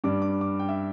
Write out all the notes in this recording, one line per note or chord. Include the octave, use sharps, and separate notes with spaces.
G2 G3 D4 D6
D6
D6
G5
E5